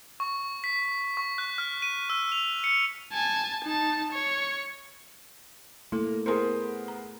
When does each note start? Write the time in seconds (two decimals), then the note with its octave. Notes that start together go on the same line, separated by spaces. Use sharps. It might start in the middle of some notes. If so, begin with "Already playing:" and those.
0.20 C#6
0.64 B6
1.17 C#6
1.38 F#6
1.58 F6
1.82 D#7
2.10 E6
2.32 F7
2.64 C#7
3.12 G#5 A5
3.64 D#4 A5
4.12 C#5
5.92 A3 A#3 E4 A4
6.26 B3 E4 G#4 A#4 C5 C6
6.88 A#5